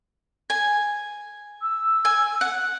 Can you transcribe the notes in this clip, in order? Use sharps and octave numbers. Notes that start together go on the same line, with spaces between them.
G#5
E6
G#5
F#5